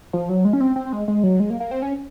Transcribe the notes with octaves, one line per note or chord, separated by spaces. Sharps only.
F3
F#3
G#3
C#4
C4
C4
G#3
G#3
F#3
G#3
A#3
A#3
C4
C#4